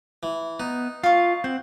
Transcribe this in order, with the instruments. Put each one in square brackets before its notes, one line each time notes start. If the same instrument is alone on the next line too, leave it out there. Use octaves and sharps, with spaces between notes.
[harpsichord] E3
[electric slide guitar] B3 [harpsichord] D#4
[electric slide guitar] F4 [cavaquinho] F5 C#6
[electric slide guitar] C4 [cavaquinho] F#5